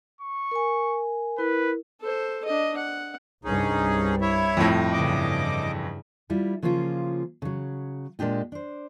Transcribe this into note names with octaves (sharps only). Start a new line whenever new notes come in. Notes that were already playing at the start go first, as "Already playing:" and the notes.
C#6
A#4 G#5
E4 A#4 B4
A4 C5
D4 D#5
F#5
C2 G2 C#4 D#4 G#4
E4 C#5 E5
F2 A2
G2 C#3 E3 D#5 D6
G3 E4 F4
C#3 F3 A#3 C#4 F4
C#3 F#3
A#2 G#3 D4 G4 D#5
D4 C5